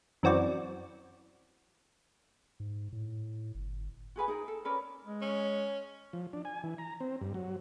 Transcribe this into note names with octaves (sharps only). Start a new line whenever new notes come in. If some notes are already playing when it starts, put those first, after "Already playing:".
F#2 E3 C4 F#4 D5
G#2
A2
G1
F#4 G#4 B4 G#5
D#4 G#4 A#4
A4
C#4 A#4 B4 D5
G#3
C#4
F3
D4
G#5
E3
A#5
C4
G2
F#3